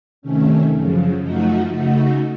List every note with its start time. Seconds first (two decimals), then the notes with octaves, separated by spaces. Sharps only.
0.22 C3 D#3 A3 C#4
0.71 F#2 C#3 F3
1.21 F#2 F3 A3 D#4 F#4
1.70 C#3 A3 D#4 F#4